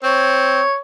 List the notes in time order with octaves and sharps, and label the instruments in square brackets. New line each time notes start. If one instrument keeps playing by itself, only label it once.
[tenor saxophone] C4 [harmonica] C#5